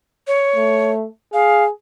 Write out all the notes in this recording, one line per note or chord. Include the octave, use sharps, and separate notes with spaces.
C#5
A3
G#4 F5